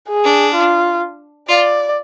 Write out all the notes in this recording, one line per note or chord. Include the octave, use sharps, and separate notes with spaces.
G#4
D4
F4
F4 D5